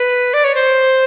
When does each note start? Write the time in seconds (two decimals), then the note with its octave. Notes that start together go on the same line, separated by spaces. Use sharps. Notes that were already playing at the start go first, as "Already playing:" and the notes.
Already playing: B4
0.34 D5
0.44 C#5
0.55 C5